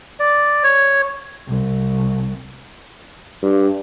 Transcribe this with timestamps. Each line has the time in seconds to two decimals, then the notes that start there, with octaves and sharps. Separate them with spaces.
0.20 D5
0.64 C#5
1.48 C2
3.42 G2